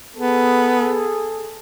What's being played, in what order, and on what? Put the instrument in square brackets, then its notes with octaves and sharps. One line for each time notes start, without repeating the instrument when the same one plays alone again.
[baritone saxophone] B3 [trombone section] G#4 A4